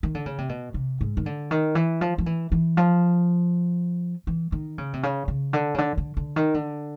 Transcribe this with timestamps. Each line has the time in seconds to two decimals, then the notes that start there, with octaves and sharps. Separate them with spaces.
0.03 D#3
0.15 D3
0.26 C#3
0.38 C3
0.49 B2
0.74 C3
1.01 G#2
1.17 D#3
1.26 D3
1.51 D#3
1.75 E3
2.01 F3
2.18 F3
2.26 E3
2.52 E3
2.77 F3
4.27 E3
4.52 D#3
4.78 C#3
4.93 C3
5.03 C#3
5.28 C#3
5.53 D3
5.74 C#3
5.78 D3
5.97 D3
6.17 D3
6.36 D#3
6.54 D3